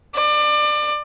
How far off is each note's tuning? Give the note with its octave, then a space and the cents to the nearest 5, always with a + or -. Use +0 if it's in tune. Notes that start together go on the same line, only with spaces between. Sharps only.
D5 +25